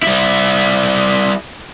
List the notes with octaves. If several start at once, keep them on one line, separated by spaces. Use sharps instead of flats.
G3 E4